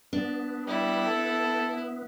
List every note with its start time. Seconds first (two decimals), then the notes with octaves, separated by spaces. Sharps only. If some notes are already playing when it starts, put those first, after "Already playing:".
0.13 B3 D4
0.67 G3 E4
1.06 A4